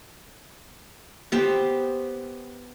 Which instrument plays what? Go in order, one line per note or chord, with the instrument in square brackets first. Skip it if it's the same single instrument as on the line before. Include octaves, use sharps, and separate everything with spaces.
[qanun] B3 G4 C5